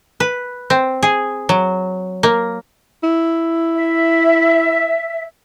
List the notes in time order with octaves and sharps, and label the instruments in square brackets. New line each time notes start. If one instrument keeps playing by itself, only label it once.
[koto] B4
C4
G#4
F#3
A#3
[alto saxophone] E4
[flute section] E5